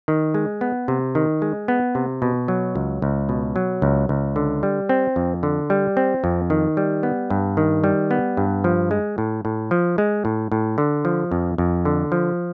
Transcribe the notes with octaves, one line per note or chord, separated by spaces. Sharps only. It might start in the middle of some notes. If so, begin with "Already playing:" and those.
D#3
G#3
B3
C3
D#3
G#3
B3
C3
B2
F#3
C#2
C#2
B2
F#3
C#2
C#2
D3
G3
C4
F2
D3
G3
C4
F2
D#3
G3
B3
G2
D#3
G3
B3
G2
F3
G#3
A2
A2
F3
G#3
A2
A2
D3
F3
F2
F2
D3
F3